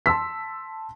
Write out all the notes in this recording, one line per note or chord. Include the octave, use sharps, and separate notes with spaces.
A5 C6 E6 B6